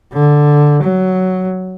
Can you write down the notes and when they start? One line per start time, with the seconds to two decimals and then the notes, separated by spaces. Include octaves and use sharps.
0.13 D3
0.83 F#3